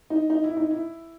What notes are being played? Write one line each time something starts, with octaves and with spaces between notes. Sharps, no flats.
D#4
D#4
E4
D#4
E4